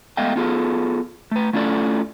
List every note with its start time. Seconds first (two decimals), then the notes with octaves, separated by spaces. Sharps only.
0.17 G#3 A3 B3 D#5 F5 G5
0.36 B3 F4 G#4 A4
1.31 A3 B4
1.53 A3 C#4 E4 F4 A4 D5